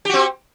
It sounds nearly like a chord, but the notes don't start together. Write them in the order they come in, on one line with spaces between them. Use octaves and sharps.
G4 F#4 C4